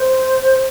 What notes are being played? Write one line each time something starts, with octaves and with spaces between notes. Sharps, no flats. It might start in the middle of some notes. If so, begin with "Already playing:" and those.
Already playing: C5